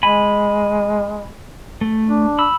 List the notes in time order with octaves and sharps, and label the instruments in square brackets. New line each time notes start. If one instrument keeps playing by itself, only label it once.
[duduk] G#3 [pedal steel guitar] G#5 B5
[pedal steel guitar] A3
[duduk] D4
[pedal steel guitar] B5 E6